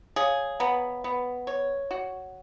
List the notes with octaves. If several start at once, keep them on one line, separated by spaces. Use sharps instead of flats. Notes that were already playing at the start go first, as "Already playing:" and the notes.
G#4 C#5 F5
B3 F#5 A#5
B3
C#5
F#4